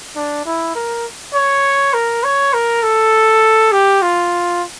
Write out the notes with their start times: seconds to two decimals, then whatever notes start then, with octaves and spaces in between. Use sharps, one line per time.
0.16 D4
0.45 E4
0.75 A#4
1.34 C#5
1.94 A#4
2.23 C#5
2.53 A#4
2.83 A4
3.72 G4
4.02 F4